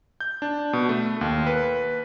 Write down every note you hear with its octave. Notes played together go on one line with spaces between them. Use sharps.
G6
D4
B2
A3
D#2
B4